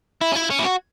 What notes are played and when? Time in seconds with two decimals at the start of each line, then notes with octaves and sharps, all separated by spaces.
0.21 E4
0.32 C#4
0.35 E4
0.50 C#4
0.59 E4
0.64 F#4